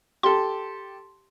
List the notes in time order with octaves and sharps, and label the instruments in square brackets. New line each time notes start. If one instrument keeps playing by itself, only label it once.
[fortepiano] G4 A4 [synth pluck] C6